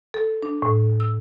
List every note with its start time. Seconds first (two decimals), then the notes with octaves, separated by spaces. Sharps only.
0.14 A4
0.43 D4
0.62 A2
1.00 E6